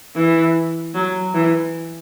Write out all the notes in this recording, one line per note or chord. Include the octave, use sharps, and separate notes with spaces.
E3
F#3
E3